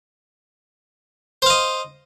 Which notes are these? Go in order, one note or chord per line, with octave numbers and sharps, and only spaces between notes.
C5 D#5 F5